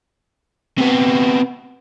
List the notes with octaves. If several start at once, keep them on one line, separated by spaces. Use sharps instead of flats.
C3 B3